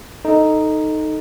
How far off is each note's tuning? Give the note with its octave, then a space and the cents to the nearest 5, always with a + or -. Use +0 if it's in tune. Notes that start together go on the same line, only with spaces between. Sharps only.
D#4 +0 A4 +5